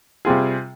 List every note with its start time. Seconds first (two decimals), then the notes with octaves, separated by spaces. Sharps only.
0.25 C3 G3 C4 F4 G#4